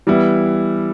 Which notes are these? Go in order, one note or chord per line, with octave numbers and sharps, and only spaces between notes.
E3 G3 B3 E4